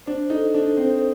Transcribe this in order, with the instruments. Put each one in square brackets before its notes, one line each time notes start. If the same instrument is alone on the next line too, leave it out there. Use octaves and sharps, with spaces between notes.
[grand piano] D4 [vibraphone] C5
[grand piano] D#4 [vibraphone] A4
[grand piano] D4 [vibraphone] A4
[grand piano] C4 [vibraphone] C5